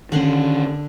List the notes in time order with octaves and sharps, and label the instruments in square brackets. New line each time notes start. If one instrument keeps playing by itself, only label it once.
[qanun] D3 F#5 C6 [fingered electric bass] D#3 C#4